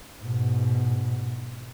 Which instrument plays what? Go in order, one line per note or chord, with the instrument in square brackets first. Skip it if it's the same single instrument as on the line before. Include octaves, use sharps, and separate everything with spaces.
[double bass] G#2 B2